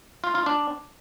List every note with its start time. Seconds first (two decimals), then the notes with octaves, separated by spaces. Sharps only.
0.24 F4
0.35 F4
0.46 D4